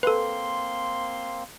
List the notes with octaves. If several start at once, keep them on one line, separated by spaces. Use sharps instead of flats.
A#3 C4 A4 B4 C6